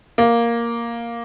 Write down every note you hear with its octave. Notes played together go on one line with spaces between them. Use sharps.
A#3